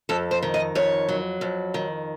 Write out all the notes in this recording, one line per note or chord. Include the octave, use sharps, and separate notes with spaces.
F2 A4
C5
D#3
D#5
F2 C#5
F#3
F2
D#3